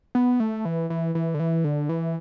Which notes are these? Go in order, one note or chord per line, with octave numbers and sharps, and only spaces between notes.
B3
A3
E3
E3
E3
D3
E3
D3
E3